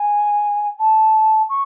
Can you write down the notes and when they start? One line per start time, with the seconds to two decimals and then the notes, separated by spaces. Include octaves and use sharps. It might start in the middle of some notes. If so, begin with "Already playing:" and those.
Already playing: G#5
0.79 A5
1.49 C#6